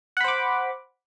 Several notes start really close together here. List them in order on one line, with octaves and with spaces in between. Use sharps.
F#5 B5 C5 D6